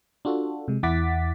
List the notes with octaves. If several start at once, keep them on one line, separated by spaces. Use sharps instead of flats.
D4 F4 F#4 A4
C3 G#3
E2 E4 F#5 D6 A6 B6